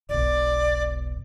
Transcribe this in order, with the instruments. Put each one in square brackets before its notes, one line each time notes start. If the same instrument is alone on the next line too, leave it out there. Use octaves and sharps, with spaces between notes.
[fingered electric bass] E1 B1 [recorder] D5